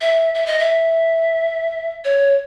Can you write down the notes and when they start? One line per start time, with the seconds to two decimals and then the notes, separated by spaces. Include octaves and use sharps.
0.01 E5
0.34 E5
0.46 D#5
0.59 E5
2.04 C#5